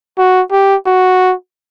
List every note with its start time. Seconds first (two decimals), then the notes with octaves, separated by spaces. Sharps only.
0.18 F#4
0.52 G4
0.86 F#4